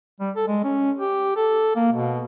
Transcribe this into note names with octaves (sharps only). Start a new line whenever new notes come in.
G3
A4
G#3
C#4
G4
A4
A#3
B2